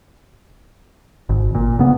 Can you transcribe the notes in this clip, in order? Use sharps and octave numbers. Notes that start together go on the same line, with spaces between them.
G#1
A#2
C#3 B3